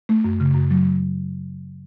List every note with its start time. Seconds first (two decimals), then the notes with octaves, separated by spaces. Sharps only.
0.09 A3
0.24 F#2
0.40 C#3
0.55 F#2
0.70 F#3